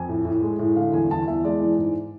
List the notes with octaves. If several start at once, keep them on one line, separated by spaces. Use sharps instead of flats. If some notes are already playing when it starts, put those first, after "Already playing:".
Already playing: F2 G#5
A2
A2
G#3
A2
D3 F5
E2 G#5
E2 A5
E2 E5
G#3 D5
E3
G#2